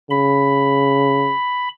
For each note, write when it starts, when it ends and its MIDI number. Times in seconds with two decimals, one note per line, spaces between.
0.10 1.33 49
0.10 1.69 83